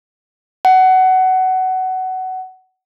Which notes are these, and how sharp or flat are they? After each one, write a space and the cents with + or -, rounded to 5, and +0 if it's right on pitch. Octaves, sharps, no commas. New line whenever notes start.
F#5 +20